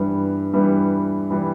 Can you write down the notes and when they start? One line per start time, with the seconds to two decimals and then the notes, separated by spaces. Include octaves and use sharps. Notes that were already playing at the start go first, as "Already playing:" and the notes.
Already playing: G2 E3 G3 B3
0.53 G2 E3 G3 B3
1.30 E3 G3 B3